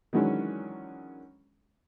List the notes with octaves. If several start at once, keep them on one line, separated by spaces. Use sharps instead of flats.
D#3 E3 F#3 G#3 C#4 D4